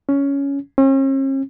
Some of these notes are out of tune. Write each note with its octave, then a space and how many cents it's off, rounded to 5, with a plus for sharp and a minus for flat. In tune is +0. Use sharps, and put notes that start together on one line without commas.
C#4 +10
C#4 -45